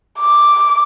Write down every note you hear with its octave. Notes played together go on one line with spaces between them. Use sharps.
D6